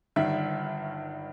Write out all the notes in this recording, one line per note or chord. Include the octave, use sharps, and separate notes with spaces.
G1 G2 D#3 E5